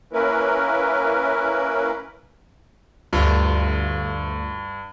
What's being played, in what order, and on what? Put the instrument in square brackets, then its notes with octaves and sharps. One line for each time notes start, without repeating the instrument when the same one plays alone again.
[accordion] A#3 C#4 E4 A#4 B4
[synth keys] D2 F4 [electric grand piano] G2